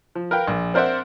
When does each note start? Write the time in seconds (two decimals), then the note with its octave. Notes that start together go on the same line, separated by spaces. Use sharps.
0.15 F3
0.31 A#4 B4 F5 G5
0.48 A#1
0.74 C4 A#4 C5 D5 E5 F#5